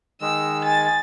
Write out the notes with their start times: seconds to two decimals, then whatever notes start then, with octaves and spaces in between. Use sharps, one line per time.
0.21 D#3 G#3 E6
0.64 G#5 A6